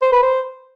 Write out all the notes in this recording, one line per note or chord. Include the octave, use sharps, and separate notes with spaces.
C5
B4
C5